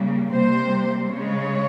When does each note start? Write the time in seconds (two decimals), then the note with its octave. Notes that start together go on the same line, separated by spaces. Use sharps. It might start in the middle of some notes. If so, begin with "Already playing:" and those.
Already playing: C#3 G3 A#3
0.31 C3 G3 A#3 C5
1.12 C#3 G#3 C#5